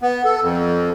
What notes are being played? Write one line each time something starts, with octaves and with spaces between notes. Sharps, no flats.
B3
A4
F2